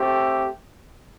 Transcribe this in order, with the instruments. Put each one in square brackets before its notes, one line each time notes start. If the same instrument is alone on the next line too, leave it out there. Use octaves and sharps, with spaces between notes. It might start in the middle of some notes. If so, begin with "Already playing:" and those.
Already playing: [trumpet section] A3 C4 G4